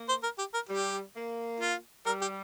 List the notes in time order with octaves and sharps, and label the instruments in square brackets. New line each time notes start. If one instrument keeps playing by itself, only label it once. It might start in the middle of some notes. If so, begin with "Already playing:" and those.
Already playing: [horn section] A#3
[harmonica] C5
A#4
G4
A#4
[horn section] G3 [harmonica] G4
[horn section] A#3
[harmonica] F4
[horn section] G3 [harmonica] A#4
[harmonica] G4